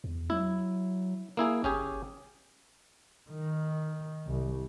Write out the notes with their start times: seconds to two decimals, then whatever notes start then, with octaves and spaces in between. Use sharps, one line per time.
0.04 E2
0.30 F#3 E4
1.37 A#3 E4 G#4
1.64 G1 C#4 G4 G#4
3.30 D#3
4.26 C2